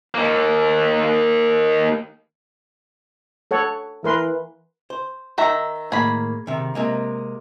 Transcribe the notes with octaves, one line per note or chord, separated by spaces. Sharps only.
D#3 A#3
A4 C#5 F#5
E3 A#4 B4 C6
C5
D#3 E5 A#5
A2 D#3 A#3 G#4 B5
C3 D#3
C3 G#3 A#3